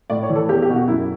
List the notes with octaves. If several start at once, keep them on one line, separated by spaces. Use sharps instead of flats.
A2 D5
C#5
E3
A4
E2 G4
G4
B2
F#4
F#2 E4